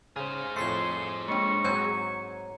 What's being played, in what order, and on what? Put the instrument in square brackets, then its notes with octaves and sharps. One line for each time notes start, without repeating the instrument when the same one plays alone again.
[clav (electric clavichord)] C#3 [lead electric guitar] G#4 C5 [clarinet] F6
[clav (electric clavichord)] F2 A2 A3 [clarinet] C6 [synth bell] G#6 C7 C#7
[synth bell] G#3 A#3 D4 [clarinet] C#6
[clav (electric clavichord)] G#2 F#3 C4 [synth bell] C#5 A#5 G#6